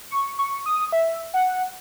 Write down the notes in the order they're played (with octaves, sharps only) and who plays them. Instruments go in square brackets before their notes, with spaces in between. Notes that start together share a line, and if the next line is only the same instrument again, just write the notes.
[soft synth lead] C#6
C#6
D#6
E5
F#5